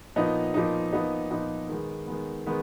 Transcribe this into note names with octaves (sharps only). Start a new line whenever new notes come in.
A#2 F3 B3 D#4
A#2 F3 B3 D#4
A#2 F3 B3 D#4
A#2 F3 B3 D#4
D#3 G#3 B3
D#3 G#3 B3
D#3 G#3 B3